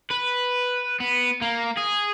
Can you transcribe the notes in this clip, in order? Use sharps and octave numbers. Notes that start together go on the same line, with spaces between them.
B4
B3
A#3
G#4